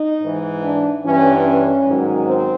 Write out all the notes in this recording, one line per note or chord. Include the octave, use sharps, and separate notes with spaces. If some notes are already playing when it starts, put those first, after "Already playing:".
Already playing: D#4
G#2 E3
D4
G2 E3 C#4
C#4
G#2 D#3 F#3
C4